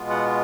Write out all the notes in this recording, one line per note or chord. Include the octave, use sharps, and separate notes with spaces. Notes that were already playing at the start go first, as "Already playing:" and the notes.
Already playing: B2 G#3 B3 F4
F#5